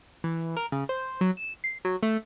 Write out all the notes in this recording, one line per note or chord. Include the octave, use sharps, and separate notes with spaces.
E3
A#4
C#3
C5
F#3
E7
C7
F#3
A3